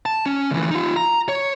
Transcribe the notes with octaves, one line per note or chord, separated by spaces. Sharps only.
A5
C#4
D2 E3
D#4 F4
A#5
C#5